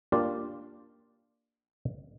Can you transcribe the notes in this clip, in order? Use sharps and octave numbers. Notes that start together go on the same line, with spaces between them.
A#3 D4 F4 G4 D5 F5